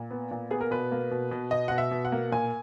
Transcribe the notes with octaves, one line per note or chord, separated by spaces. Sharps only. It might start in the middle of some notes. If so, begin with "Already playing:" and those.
Already playing: A#2
B3
A#2
B3 G#4
A#4
B2 B4
A#3
B2
B2
B2 D#5
B2 F#5
E5
B2
F#5
A#3
A#2 G#5